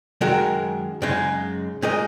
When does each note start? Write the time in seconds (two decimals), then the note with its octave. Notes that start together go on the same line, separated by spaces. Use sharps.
0.21 F#2 D#3 G#3 F#4 A#4
1.02 F#2 C#3 G#3 D#4
1.82 A#2 G#3 D#4 A#4 D#5